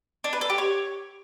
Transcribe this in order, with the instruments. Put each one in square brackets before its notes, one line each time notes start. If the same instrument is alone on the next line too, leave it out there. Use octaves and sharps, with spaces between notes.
[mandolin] D4
B4
A4
G4
C#5